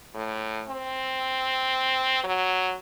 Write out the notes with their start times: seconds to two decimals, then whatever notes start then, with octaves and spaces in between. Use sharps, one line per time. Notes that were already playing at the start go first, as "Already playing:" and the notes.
0.15 A2
0.69 C4
2.24 F#3